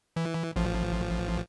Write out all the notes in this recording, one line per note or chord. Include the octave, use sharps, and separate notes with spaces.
E3
A1 F3